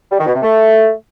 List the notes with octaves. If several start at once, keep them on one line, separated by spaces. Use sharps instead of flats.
G3
D#3
B2
C3
A3